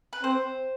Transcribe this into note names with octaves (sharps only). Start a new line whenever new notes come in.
B4
C4 C5